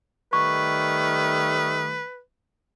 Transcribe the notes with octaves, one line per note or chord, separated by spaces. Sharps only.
D#3 G3 A3 B4 C#6